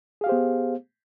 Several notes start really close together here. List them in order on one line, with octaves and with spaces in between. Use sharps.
G#4 F5 G4 C5 B3